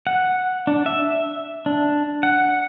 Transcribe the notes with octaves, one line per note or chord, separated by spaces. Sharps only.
F#5
D4
E5
D4
F#5